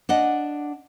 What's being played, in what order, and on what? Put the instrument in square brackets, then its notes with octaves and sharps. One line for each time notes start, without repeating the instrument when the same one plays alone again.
[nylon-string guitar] D4 D#5 F#5